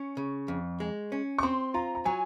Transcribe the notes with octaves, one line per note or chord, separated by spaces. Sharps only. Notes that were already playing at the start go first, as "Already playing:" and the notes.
Already playing: C#4 C#6
C#3
F2
G#3
C#4
C#6
C4 C6
F4 A#5
A#5
F#3 G#5